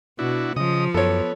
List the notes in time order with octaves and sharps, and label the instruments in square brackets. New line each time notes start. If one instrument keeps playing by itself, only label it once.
[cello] B2 [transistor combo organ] D4 E4 F#4
[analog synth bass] C#3 [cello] F3 [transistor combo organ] D#5 D#6
[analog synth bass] F#2 [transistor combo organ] B3 [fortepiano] A4 C#5